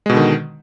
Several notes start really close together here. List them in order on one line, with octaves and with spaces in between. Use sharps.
G#3 B2 D3 D#3